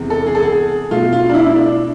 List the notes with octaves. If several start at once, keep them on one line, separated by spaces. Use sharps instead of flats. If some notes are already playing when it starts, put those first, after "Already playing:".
Already playing: E2 C3 G#3
A4
G#4
A4
G#4
B2 A3 F4
F4
D4
E4
E4
D4